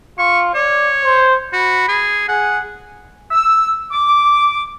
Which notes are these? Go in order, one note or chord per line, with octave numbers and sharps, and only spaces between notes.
F4 C#6
C#5 D5
C5
F#4 B5
G#4
G#4 F#5
E6
D6